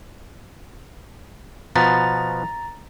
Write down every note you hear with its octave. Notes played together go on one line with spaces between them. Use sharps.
B2 F3 B3 A#5 A6